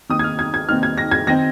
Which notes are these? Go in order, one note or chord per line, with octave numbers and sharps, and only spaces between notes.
D#2 D#3 C4 D#4 D#6
G#6
F6
G#6
G#6
D#2 D#3 C4 D#4 F6
G#6
A#6
G#6
D#3 C4 D#4 A#6